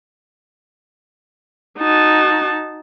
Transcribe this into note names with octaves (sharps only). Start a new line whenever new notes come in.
D#4 F#4 A5